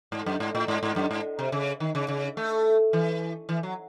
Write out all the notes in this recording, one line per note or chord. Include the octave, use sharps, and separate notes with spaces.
G#2
F#2
G#2
A2
G#2
G#2
F#2
G#2
C3
C#3
D#3
C#3
C#3
A3
E3
E3
F#3